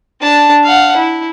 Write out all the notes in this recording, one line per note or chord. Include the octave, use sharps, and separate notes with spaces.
D4 A5
F5 F#5
E4